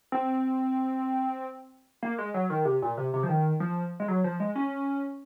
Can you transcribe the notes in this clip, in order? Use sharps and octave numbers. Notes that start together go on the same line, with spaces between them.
C4
A#3
G#3
F#3
D#3
C3
A#2
C3
C3
F3
D#3
F3
G#3
F#3
F3
G#3
C#4